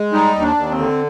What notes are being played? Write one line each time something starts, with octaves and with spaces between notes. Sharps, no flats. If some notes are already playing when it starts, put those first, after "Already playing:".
Already playing: G#3
G3 D#4
D#2
D4
D#2
C4
D3